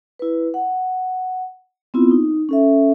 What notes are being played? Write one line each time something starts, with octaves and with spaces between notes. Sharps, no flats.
E4 B4
F#5
B3 C4 E4 F4
D#4
C#4 A4 E5